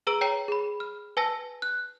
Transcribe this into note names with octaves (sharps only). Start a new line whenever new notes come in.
G#4 B4 A#5 E6 D7 F#7
C#5 G5 A#5 C7
G#4 B5
F6
B4 G#5 A5 E6 A#6
F#6